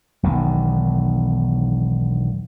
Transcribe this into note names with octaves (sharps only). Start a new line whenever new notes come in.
E1 B1 E2 D#3